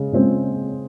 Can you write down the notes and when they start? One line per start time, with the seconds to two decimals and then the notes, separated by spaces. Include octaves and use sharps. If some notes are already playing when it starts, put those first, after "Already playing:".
Already playing: C#3 G#3
0.13 C#3 G#3 C4